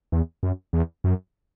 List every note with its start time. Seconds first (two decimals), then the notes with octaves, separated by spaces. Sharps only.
0.12 E2
0.43 F#2
0.73 E2
1.04 F#2